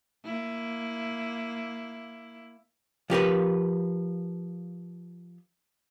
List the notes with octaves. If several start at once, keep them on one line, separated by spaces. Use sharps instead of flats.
A#3 E4
F3 G4 A#4 B4